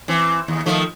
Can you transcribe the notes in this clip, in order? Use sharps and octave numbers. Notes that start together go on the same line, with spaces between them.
E3 C4
D#2
D#3 F3 A3